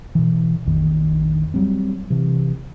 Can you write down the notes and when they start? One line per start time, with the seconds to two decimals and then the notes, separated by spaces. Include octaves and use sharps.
0.15 B2 E3
0.66 A#1 F2 D#3
1.54 F#3 G3 C4
2.10 C3 E3